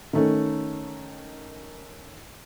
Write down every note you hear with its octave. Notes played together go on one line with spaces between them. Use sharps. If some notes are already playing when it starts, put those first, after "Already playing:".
D#3 A3 C#4